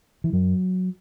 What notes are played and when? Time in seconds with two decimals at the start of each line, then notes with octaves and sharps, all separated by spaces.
0.24 E3
0.33 F#2 F#3